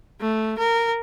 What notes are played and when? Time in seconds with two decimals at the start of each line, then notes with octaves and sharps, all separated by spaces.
0.20 A3
0.58 A#4